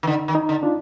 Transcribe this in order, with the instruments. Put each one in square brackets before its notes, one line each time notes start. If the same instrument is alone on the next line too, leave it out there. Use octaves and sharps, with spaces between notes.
[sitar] D#3
[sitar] D3 [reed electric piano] D#4
[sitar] D#3
[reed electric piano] D#4
[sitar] D3
[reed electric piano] D4 F4